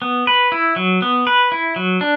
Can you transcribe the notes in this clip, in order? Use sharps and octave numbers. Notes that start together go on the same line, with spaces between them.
B3
B4
E4
F#3
B3
B4
E4
F#3
D4